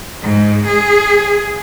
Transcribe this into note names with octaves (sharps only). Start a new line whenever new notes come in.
G#2
G#4